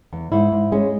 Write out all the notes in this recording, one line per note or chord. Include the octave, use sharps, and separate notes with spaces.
E2
G#2 E4
G#2
G#3 C#4